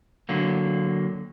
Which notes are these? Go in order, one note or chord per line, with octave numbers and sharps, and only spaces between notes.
D3 F#3 A#3